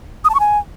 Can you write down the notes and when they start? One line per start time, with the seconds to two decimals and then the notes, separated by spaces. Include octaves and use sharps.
0.25 D#6
0.30 A5
0.35 C#6
0.40 G#5